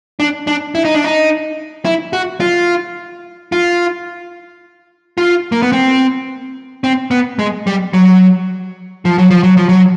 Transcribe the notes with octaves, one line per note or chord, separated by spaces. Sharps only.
D4
D4
E4
D#4
D4
D#4
E4
F#4
F4
F4
F4
A#3
B3
C4
C4
B3
G#3
G3
F#3
F3
F#3
F3
F#3
F3
F#3